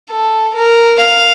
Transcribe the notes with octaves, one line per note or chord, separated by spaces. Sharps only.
A4
A#4
F5